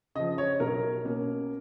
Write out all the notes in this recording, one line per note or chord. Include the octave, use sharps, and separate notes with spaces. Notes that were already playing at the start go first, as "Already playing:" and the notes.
C#3 F3 D#5
C#5
B1 A#4
B2 A#3 C#4